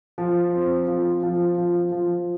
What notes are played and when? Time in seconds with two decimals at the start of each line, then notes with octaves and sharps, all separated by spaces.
0.18 F3
0.53 C4
0.88 F3
1.23 F3
1.58 F3
1.92 F3